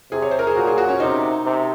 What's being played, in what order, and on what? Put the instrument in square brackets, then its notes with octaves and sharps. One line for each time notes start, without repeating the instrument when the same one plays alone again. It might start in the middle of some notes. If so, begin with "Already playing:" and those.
[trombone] C3 [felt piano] G#4
[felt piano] C#5
C5
A#4
G#4
[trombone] A#2 [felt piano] F#4
[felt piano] G#4
F#4
C#4
[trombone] C3 [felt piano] D#4
[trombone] C3